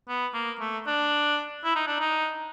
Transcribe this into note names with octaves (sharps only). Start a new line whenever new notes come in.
B3
A#3
A3
D4
E4
D#4
D4
D#4